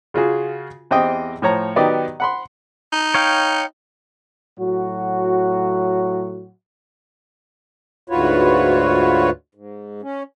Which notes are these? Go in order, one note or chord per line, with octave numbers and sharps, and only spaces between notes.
C#3 F4 F#4 G#4
E2 C4 G4 D#5 G5 D#6
A2 F3 C#5 A#5
D#3 F#3 B3 G4 D5 D#5
F#5 B5 C6
D#4
C#5 F5 G5
A2 F#3 F#4
D2 G#2 F4 F#4 B4 C#5
G#2
C#4